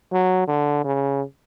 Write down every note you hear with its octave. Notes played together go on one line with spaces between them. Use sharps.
F#3
D3
C#3